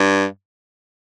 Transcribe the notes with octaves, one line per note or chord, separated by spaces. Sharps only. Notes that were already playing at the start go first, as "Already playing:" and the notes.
Already playing: G2